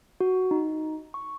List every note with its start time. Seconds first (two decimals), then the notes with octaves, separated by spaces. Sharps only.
0.21 F#4
0.51 D#4
1.14 C#6